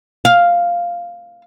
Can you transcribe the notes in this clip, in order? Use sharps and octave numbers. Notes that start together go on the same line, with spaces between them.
F5